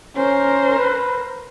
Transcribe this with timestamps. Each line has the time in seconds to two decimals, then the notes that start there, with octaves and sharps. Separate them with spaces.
0.17 C#4 A#4 C5
0.78 B4